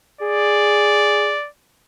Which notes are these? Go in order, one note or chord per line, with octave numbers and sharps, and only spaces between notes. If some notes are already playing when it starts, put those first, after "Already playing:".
G#4 D5